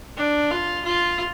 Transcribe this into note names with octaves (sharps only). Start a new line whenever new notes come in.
D4
F4
F4